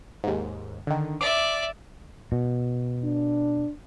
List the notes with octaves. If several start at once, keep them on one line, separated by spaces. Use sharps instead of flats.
D#2 G#2
D3 D#3
D5 E5 D6
B2
D4